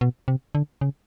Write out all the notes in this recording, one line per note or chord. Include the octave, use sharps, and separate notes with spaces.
B2
C3
D3
C#3